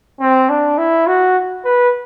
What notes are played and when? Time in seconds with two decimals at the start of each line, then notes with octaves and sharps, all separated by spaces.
0.20 C4
0.49 D4
0.78 E4
1.07 F#4
1.64 B4